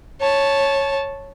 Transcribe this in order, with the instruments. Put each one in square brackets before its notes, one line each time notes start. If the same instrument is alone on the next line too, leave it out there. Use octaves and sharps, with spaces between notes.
[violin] C#5 A5